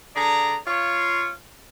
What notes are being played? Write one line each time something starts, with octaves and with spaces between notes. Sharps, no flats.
D3 G#4 D5 A#5
F4 C#5